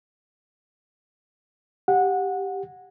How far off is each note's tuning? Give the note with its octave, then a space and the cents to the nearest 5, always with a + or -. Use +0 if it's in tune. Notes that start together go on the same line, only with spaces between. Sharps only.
G4 +0 F#5 -20